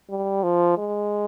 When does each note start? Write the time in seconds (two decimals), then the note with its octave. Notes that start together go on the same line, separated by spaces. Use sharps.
0.10 G3
0.43 F3
0.78 G#3